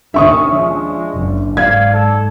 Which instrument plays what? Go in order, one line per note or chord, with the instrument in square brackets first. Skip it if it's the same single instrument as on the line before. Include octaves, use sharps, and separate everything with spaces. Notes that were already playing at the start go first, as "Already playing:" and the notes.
[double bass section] D#2 D#3 C#4 [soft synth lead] D4 [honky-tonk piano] E5 C#6 D#6
[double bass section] F3 [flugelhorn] G#3
[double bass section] F#1 F#2
[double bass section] G#2 [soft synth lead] D5 [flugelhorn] F5 [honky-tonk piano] G#6
[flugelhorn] A4